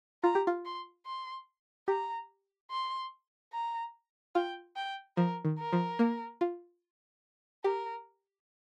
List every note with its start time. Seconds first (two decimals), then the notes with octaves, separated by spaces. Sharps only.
0.23 F4 A#5
0.35 G4
0.47 F4
0.65 C6
1.06 C6
1.88 G4 A#5
2.71 C6
3.53 A#5
4.35 F4 G5
4.76 G5
5.17 F3 A#4
5.45 D#3
5.58 A#4
5.73 F3
5.99 A#3
6.41 F4
7.64 G4 A#4